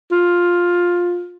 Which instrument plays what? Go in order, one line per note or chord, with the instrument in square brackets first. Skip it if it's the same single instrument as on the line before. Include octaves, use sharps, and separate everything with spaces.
[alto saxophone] F4